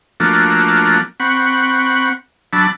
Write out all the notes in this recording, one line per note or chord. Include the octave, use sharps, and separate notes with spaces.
F3 A3 A#3 D4 F#4
C4 F#5 B5 C#6
F#3 D4 A5 B5 E6